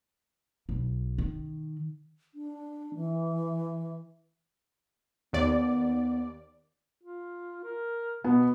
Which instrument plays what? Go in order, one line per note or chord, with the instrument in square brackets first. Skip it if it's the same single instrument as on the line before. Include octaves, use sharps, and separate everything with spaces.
[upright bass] B1
D#3
[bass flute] D4
E3
[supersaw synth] D#2 D5 [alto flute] B3
[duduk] F4
A#4
[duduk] B2 [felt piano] B3